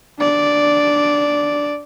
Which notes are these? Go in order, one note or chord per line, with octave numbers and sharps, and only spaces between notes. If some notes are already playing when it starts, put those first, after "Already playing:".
D4 D5